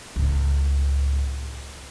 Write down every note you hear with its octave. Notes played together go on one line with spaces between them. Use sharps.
C#2 A2